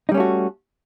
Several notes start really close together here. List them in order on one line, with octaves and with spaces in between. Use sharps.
D#4 G3 C#4 A3 F#4